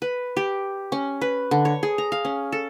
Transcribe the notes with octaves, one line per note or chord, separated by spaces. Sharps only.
B4
G4
C#4
B4
D3
C#5
G#4
A#5
F5
C#4
A4